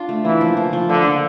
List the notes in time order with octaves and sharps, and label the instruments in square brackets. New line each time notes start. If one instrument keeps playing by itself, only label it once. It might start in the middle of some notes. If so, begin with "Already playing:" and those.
Already playing: [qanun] D4 F4
A3
[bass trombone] E3 [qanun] A#3
[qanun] F3
F3
F3
[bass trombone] D3 [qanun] A#3
[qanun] F3